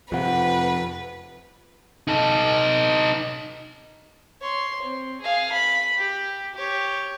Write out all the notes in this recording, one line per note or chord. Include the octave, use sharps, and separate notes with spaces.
F2 C3 F4 B4 F#5
D#4 A4
C#5 C6
C4
G#4 F5
B5
G4
G4 C#5